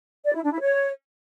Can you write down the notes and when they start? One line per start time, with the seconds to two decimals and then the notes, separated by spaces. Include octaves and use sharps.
0.24 D5
0.34 E4
0.43 D4
0.52 E4
0.61 C#5